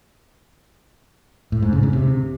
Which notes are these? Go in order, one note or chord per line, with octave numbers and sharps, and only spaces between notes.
A2
G#2
C#3
C#3
C3